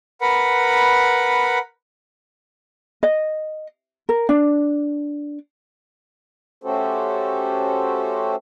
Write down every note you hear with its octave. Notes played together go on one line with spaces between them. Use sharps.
A#4 B4 F#5 B5
D#5
A#4
D4
A3 C#4 F#4 G4 A4 C5